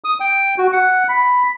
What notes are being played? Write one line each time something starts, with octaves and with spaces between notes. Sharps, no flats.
D#6
G5
F#4
F#5
B5